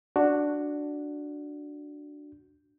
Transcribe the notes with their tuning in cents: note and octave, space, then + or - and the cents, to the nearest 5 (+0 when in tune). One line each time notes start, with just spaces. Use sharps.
D4 +0 F#4 +0